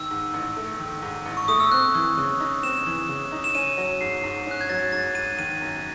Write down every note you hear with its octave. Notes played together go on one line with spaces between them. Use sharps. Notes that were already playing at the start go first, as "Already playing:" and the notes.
Already playing: D#3 E6
G#2
A1
A3
D#3
G#2
A1
C#6
A3 D#6
E6
C4 F#6
E3
C#3
D#4
C4 E7
E3
C#3
D#4
E7
C#4 D#7
F#3
G#2 C7
G#2
C#4 F#6
G#6
F#3 A6
G#2 A6
G#2 D#7
D#3 D#7
F#2